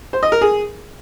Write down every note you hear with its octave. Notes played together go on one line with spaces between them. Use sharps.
C5
D#5
A#4
G#4